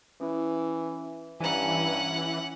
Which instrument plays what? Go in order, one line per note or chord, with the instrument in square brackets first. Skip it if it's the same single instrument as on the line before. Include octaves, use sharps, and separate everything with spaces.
[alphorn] E3 [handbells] C#4 E4
[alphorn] G2 [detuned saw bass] E3 [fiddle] C#4 F#5 [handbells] G#5 A#5